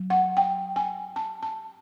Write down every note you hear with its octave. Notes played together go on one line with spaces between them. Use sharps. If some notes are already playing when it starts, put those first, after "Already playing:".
Already playing: F#3
F#5
G5
G#5
A5
A5